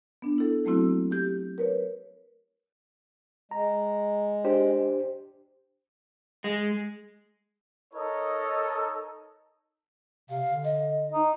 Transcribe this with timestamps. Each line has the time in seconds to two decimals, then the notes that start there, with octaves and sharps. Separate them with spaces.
0.22 B3 D4
0.38 E4 A4
0.65 F#3 A3 A#3 C4 E4 F#4
1.11 G4 G6
1.58 A#4 B4 C#5
3.51 G#3 A#5
4.44 D4 G4 C5
6.44 G#3
7.93 D#4 A4 A#4 C#5 D#5
10.30 C3 F5
10.47 D3
10.64 D#5
11.10 D#4